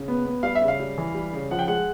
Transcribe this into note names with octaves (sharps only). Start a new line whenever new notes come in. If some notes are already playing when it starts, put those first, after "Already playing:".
Already playing: C#3
B3
B3
G3 F5
E5
C#3
F5
G3
E3
G3
C#3
F3 F#5
G5
G#3 F#5